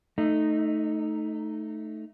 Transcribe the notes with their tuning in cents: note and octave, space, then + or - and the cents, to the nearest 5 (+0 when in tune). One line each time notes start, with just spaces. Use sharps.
A3 +0 D#4 +0